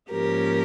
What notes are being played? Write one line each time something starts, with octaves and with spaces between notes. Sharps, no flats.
G#2 F3 A#3 C#4 G4 A#4